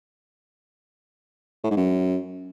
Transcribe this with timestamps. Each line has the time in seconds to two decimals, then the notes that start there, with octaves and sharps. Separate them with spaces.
1.64 A2
1.70 G#2
1.77 F#2